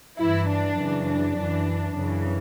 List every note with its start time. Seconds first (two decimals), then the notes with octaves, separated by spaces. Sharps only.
0.18 G2 E3 E4
0.49 D4
0.77 F#2 C#3 E3
1.06 D4
1.36 F#2 E3
1.95 F#2 C#3 E3